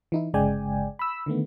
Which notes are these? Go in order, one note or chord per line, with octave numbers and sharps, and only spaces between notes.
E3 D#4 E4
G1 C#3 G#3 D5 G5 G#5
B5 E6
D3 D#3 A3 B3